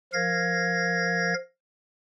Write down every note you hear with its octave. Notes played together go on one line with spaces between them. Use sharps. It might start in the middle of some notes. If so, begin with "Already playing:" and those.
F3 A#4 F5 G#6 A#6